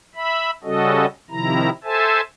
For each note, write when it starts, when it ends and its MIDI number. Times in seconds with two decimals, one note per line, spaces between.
0.16 0.51 76
0.16 0.51 83
0.64 1.06 49
0.64 1.06 55
0.64 1.06 61
0.64 1.06 66
0.64 1.06 69
0.64 1.06 75
1.30 1.70 48
1.30 1.70 51
1.30 1.70 53
1.30 1.70 64
1.30 1.70 82
1.84 2.21 69
1.84 2.21 72
1.84 2.21 76
1.84 2.21 80
1.84 2.21 81